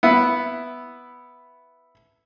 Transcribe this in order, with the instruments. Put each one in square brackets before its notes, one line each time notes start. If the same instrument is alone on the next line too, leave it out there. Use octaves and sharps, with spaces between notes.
[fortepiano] B3 E4